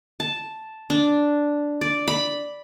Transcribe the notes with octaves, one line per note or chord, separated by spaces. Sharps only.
A5
D4
D5
B5